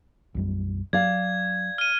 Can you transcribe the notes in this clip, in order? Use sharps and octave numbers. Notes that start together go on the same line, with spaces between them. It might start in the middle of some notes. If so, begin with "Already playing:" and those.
B1 F#2 G3
F#3 D5 F5 G#6
F6 D#7